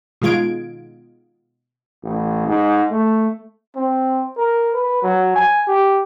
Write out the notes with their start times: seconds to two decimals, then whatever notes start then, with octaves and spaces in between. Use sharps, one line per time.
0.21 B2 D#3 G#3 F4 G#6 D7
2.03 A1
2.47 G#2
2.91 A3
3.76 C4
4.37 A#4
4.74 B4
5.03 F#3
5.36 G#5
5.68 G4